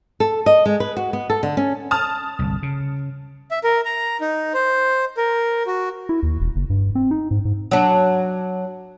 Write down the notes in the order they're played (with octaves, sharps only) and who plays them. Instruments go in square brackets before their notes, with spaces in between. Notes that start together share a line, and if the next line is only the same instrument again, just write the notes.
[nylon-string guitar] A4
D#5
G#3
B4
F#4
B3
A4
D3
C#4
[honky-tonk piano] A5 D#6 F6
[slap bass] G1 C2
C#3
[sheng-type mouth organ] E5
A#4
A#5
D#4
C5
A#4
F#4
[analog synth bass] E4
D#2
E1
F#1
G2
C4
D#4
G#2
G#2
[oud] F#3 D4